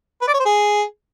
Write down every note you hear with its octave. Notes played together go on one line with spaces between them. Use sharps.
B4
D5
C#5
C5
G#4